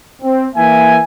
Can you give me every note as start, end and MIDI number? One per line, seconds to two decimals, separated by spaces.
0.22 0.46 60
0.55 0.99 52
0.55 0.99 58
0.55 0.99 76
0.55 0.99 80